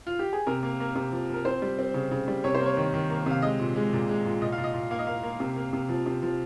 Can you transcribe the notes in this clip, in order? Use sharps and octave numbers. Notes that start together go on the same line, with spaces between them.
F4
G4
G#4
C3 A#4
A#3
A#3
C3
F3
F3 A#4
C4 C5
G3
C4
C#3
C#3
G3
C3 C#5
C5
A#3
C#5
D#3
D#3
A#3
C3 F5
G#3 D#5
A#2
G#3
A#2
G#3
A#2
A#2 D#5
F5
A#2
D#5
A#2
A#3 F5
D#5
A#3 F5
A#3
C3
A#3
C3
F3
C3
F3